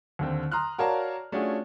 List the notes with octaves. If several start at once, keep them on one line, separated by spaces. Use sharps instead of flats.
D#2 D3 C4
A#5 C6 D#6 F6 F#6
F#4 A#4 C#5 D5 F5 A5
A3 C#4 D4 F4 F#4 G#4